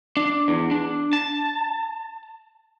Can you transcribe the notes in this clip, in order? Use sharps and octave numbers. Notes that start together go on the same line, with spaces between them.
D4
E2
D4
A5